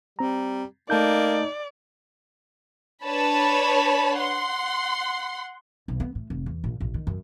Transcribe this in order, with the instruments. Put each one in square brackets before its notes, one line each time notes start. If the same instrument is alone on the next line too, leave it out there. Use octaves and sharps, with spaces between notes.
[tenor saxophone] G3 [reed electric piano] C4 A#5
[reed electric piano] A3 A5 G6 [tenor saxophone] A#3 [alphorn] D#4 [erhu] D5
[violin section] D4 B4 C#5 A5 B5
F#5 C6
[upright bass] B1
B3
A2
F1
E2
A#1
A#1
D#3
F#2